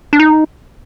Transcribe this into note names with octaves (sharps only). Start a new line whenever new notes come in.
D4
D#4